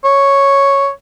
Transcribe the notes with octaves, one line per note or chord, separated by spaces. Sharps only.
C#5